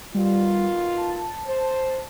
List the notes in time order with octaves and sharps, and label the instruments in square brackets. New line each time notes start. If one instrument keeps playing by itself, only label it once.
[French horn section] B2 D#3 F4 [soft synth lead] G3
[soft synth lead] A5
[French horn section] C5